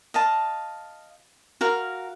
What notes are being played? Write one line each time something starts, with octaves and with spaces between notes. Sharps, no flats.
D#5 F5 A5
F#4 A#4 F5